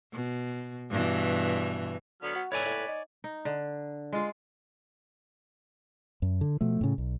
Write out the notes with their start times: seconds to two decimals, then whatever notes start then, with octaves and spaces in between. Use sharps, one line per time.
0.13 B2
0.90 G2 B2 E3
2.22 D3 F#3 B3 F6
2.36 F#4
2.52 A2 B4 C#5 D5 G#5
2.66 A2
2.88 D#4
3.24 D#4
3.45 D3
4.12 G#3 F4
6.22 F#2
6.41 D3
6.61 B2 F3 A3
6.81 A2 C#3
6.98 B1